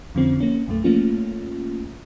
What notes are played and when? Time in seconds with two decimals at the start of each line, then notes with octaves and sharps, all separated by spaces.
0.15 F2 D3 F3 C4 C#4
0.40 A#3 C#4
0.67 B1 F#2 A3
0.84 F3 A3 A#3 C#4 F4